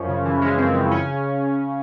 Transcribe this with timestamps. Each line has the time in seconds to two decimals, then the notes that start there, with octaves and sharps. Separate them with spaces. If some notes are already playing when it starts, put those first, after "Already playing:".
Already playing: F#2 F3 C#4
0.08 C#3
0.25 E3
0.42 G#3 C#4
0.58 F#2 C4
0.75 C#3
0.91 C#4